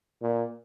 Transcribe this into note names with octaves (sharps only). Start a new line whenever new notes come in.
A#2